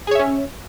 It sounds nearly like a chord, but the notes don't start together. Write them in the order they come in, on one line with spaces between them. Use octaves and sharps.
G#4 C#5 E5 C#4